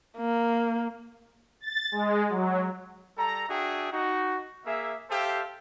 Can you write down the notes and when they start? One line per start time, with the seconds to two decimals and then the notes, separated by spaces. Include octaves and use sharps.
0.17 A#3
1.61 A6
1.92 G#3
2.30 F#3
3.18 G3 A4 A#5
3.49 D4 F#4 G#4 E5 G5
3.92 D#4 F#4
4.66 A#3 G#4 E5
5.10 G4 A4 C5 E5 F5